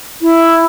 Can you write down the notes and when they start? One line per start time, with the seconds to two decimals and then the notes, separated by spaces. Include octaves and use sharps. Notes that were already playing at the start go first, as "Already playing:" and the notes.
0.22 E4